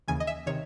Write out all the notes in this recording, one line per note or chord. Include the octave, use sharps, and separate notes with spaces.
D#2 C#3 E3 G#5
D#5
E5
C3 D#3 C#5